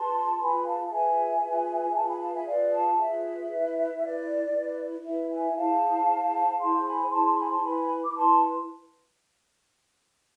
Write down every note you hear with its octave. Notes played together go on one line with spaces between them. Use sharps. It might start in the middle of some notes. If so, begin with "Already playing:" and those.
Already playing: F4 G#4 B4 A5 C6
F4 G#4 B4 G#5 B5
F5 A5
A5
F4 G#4 B4 E5 G#5
F4 G#4 B4
F4 G#4 B4 F5 A5
G#5 B5
F5 A5
E5 G#5
F4 G#4 B4 D5 F5
F5 A5
F4 G#4 B4 E5
B4
E4
E4 B4 D5
E4 B4
E4 B4 E5
E5 G#5
E4 G#4 C5 F5 A5
E4 G#4 C5
E4 G#4 C5 A5 C6
G#5 B5
E4 G#4 C5 A5 C6
A5 C6
G#5 B5
A5 C6
E4 B4 G#5 B5
D6
E4 B4 A5 C6